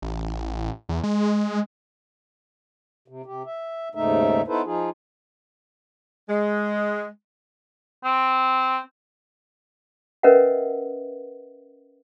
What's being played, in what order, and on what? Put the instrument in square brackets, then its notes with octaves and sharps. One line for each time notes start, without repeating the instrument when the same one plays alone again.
[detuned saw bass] A1
E2
G#3
[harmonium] C3
C3 G4
E5
D#2 G#2 C#3 A3 D#4 E5
B3 D#4 E4 A4 B4 C5
F3 D#4 F4 G#4
[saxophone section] G#3
[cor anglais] C4
[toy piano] C#4 A#4 B4 D#5 E5 F#5